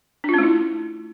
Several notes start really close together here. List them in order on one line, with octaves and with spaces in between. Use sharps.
D4 F4 C#4 A3 E4